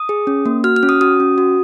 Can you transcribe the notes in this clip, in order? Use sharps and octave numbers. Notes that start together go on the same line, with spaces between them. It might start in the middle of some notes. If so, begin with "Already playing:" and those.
Already playing: D#6
G#4
C#4
A#3
F#4 F6
F6
C#4
D#6
F#4 D#6
C#4
F#4